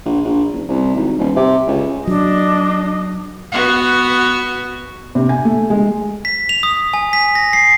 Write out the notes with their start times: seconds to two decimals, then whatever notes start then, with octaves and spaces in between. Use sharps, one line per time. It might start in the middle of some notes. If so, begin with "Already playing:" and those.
0.05 A#1
0.24 A#1
0.53 F#1
0.68 C2
0.95 G#1
1.18 D#1
1.36 C3
1.67 C#2
2.07 F#3 D4 D#5
3.52 B3 F#4
5.15 C3
5.29 G#5
5.45 A3
5.70 G#3
6.25 B6
6.49 F7
6.63 D#6
6.94 G#5
7.13 B6
7.35 A#6
7.53 C7